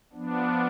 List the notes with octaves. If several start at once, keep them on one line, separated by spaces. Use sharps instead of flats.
F3 B3 D4